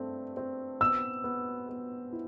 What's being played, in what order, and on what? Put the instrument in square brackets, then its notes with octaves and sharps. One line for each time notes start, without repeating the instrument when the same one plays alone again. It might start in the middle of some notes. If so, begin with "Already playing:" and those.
Already playing: [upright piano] G2 A3 C4
C4
[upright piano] B3 [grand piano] E6
[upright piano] B3
B3
E4